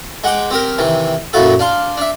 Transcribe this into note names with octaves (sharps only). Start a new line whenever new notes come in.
G#3 F#5 G5 D6
C4 G4 A#4
C3 D#3 E3
F#2 A#2 F3 E4 F#4 A4
D4 F5 C6
D4 E5